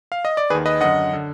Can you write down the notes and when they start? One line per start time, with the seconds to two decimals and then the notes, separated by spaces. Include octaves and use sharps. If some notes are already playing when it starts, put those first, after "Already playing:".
0.12 F5
0.25 D#5
0.37 D5
0.50 D#2 D#3 G#4 B4
0.66 B4 D#5
0.81 F#2 D3 D#5 F#5
1.13 D3